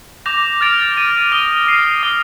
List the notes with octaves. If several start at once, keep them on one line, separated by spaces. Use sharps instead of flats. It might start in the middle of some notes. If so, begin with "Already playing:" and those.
D6 G6 A#6 F7
F6 A6 D7 F7
D6 A6 D#7
D#6 A#6 D#7 G7
F6 C7 D#7
D#6 A6 C7 G7